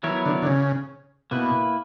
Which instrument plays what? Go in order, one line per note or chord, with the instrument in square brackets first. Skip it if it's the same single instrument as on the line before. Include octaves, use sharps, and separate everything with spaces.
[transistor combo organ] E3 [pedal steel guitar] F#3 B3 E4 A#4 C#5
[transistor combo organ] D3
D3
C#3
[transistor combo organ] B2 [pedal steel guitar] A#3 E4 B4